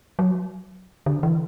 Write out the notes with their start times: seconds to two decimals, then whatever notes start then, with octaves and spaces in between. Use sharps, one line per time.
0.19 F#3
1.06 D3
1.23 E3